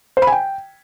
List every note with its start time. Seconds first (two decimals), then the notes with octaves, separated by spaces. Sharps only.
0.17 C5
0.22 B5
0.27 G#5
0.32 G5